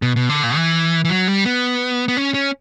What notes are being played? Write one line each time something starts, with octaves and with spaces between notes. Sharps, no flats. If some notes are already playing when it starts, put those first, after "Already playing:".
B2
B2
D3
A#2
E3
E3
F#3
G3
B3
B3
C#4
C#4